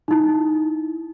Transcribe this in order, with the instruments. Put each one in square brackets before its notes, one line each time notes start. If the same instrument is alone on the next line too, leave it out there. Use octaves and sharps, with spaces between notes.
[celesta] D#4 E4